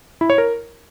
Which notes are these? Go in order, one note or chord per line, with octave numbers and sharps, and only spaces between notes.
E4
C#5
A#4